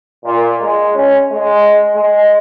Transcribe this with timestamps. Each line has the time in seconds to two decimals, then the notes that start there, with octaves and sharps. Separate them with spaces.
0.23 A#2
0.59 G#3
0.93 C#4
1.32 G#3
1.95 G#3